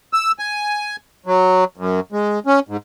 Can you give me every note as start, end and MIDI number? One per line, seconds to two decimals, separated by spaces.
0.13 0.32 88
0.39 0.96 80
1.26 1.64 54
1.77 2.00 42
2.12 2.40 56
2.46 2.60 61
2.68 2.77 44